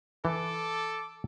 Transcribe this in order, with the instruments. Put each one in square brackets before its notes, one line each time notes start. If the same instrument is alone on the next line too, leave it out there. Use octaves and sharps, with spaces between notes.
[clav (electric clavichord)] E3 [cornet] A4 [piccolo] D6